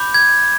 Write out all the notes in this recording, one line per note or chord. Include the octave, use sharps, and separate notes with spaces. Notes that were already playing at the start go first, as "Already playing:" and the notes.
Already playing: B5 D6 G6
G#6